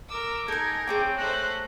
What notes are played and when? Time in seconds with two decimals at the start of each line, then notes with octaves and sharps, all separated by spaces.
0.11 A#4 D6 E6
0.48 D#4 A4 A#4 G#5 G#6
0.87 C4 G#4 C#5 G5 D6
1.18 A3 C5 A#5 F#6